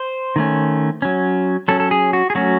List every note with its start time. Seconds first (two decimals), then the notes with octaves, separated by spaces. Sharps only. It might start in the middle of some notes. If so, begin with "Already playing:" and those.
Already playing: C5
0.36 D#3 A3 C#4
1.02 F#3 C#4
1.68 F#3 C#4 A4
1.80 A4
1.91 G#4
2.13 F#4
2.30 G#4
2.35 F#3 A3 C#4 F#4